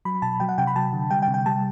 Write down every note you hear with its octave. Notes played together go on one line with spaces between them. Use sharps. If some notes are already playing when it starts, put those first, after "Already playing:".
F#3 B5
B2 A5
F#3 G5
F#5
C3 G5
B5
F#3 A5
D3
G3 G5
G5
C3
G5
G3 A5